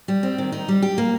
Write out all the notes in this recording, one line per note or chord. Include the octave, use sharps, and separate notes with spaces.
G3
C4
D#3
D#4
G3
G4
A#3